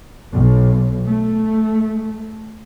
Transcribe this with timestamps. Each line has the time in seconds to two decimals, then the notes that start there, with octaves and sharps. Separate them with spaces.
0.32 B1
1.06 A3